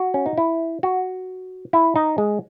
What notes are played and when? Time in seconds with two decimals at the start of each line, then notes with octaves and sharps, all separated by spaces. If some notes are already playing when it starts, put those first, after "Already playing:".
Already playing: F#4
0.14 C#4
0.26 D#4
0.38 E4
0.83 F#4
1.73 E4
1.96 D#4
2.18 G#3